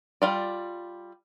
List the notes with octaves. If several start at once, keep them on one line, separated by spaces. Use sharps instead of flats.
G3 F4 D5